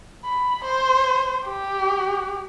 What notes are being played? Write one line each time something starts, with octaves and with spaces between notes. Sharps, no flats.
B5
C5
G4